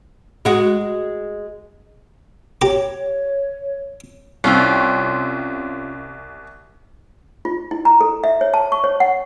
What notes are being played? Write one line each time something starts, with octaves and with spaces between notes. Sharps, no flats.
G#3 F#4
G4 C#5 A#5 D6
C2 C4 C#4 F4
F4
E4
A#5
A4
E5
C#5
A5
C#6
C#5
F#5